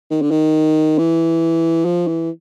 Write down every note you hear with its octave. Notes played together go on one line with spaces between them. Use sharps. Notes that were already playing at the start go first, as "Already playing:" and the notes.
D#3
D3
D#3
E3
F3
E3